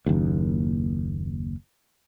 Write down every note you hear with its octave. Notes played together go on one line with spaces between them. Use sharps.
F#1 D#2